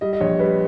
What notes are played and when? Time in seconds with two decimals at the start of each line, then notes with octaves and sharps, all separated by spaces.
0.01 G3 D#5
0.13 D#5
0.20 A#1 C#5
0.39 G3 B4